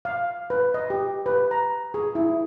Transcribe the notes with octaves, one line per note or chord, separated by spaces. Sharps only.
F5
B4
D#5
G4
B4
A#5
G#4
E4